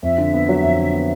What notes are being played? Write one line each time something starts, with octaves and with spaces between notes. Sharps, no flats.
F2 E5
D3
B3
F#3
F2
D3
B3